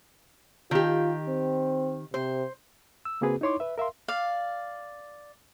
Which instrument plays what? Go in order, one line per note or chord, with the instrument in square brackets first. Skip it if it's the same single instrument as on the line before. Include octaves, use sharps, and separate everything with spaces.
[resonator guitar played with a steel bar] D#3 G4 [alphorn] F4
[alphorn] C4
[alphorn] C3 [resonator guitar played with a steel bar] C5
[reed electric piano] E6
C#3 A#3 C4 F#4 G#4 B4
D#4 E4 C#5 C6 D6
B4 E5
A#4 E5 F5 C6
[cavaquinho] D5 F5